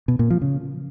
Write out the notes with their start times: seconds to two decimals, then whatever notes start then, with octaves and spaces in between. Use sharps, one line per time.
0.08 B2
0.19 A#2
0.30 F3
0.42 C#3